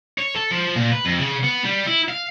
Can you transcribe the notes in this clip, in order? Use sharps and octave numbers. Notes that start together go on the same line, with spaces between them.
C#5
A4
F3
A#2
B4
F2
C#3
B3
G3
E4
F5